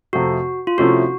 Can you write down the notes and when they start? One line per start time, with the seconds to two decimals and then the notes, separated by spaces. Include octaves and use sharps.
0.13 F2 C3 F3 A3 F#4
0.67 F4
0.78 C3 F3 A3 C#4 E4 F#4